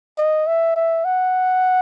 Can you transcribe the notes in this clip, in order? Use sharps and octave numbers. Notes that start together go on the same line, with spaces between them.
D#5
E5
E5
F#5